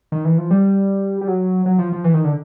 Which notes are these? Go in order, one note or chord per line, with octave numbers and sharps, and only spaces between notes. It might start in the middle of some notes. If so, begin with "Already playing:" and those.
D#3
E3
F3
G3
G3
F#3
F#3
F3
F3
E3
D#3
D3